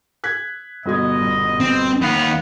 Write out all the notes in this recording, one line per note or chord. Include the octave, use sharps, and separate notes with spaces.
F#6 G#6 B6
G1 B2 D#5 G#6
D#1
C4
D#2 B3 F5